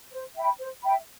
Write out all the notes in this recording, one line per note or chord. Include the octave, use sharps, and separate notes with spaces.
C5
E5 G5 B5
C5
E5 G5 B5